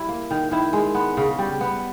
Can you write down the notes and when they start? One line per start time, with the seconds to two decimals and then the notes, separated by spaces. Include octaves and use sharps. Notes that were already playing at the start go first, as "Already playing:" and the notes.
Already playing: G3 E4
0.08 A#3
0.31 D#3
0.51 D#3 E4
0.73 G#3
0.95 B3
1.17 C#3
1.39 G3
1.61 B3